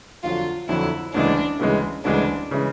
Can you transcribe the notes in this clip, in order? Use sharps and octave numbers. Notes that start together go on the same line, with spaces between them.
F2 D3 F#3 F4
F2 D3 F#3 E4
D2 C#3 E3 G#3 D4
D2 C#3 E3 G#3
D2 C#3 E3 G#3 D4
C#3 E3 G#3